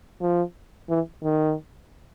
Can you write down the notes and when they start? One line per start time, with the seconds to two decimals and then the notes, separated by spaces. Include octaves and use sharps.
0.22 F3
0.89 E3
1.23 D#3